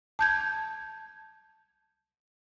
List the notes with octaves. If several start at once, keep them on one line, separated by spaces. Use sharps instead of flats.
A5 G6 G#6